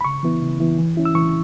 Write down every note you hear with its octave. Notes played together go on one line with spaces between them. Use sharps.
B5
C#3 C#6
E3 B3 E4
C#3
E3 B3 E4
E3
C#4 E4
E6
E3 C#6